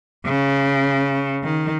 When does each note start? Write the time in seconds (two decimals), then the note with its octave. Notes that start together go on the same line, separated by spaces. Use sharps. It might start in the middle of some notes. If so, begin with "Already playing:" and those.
0.25 C#3
1.44 D#3